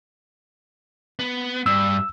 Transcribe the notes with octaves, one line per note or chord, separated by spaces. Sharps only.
B3
G2 E6